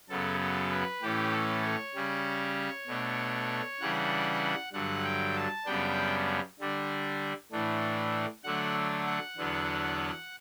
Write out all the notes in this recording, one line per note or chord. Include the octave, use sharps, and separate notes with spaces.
F#2 C#3 F#3 B3 A4
A4
B4
A2 E3 A3 C#4 G4
A4
C#5
C#3 G3 C#4
B2 A3 D4
C#3 E3 G3 D4 F#5
G2 D3 F#3 F#5
G5
A5
F#2 C#3 G3 B3 D4 G5
D3 G3 D4
A2 E3 A3 D4
D3 F#3 A3 D4 F#5
F#5
E2 D3 F#3 B3 D4